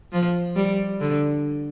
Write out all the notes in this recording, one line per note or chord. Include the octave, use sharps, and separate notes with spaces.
F3
G3
D3